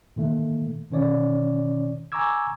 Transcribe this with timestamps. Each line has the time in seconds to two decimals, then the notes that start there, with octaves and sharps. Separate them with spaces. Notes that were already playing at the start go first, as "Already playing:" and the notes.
0.16 A#2 D#3 A3 A#3
0.90 B2 D#3 C#4 C#5 D5
2.12 G#5 A#5 C#6 D6 E6 G#6